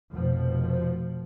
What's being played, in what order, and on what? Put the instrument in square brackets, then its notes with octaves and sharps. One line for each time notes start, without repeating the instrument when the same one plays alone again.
[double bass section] F1 B2 F3